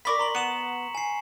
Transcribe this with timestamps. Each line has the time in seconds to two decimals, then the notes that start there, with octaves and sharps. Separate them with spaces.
0.05 A#4 D5 B5 C#6 B6
0.19 A#5 C6 F#7
0.35 B3 C#7 E7 F#7
0.95 G#5 C7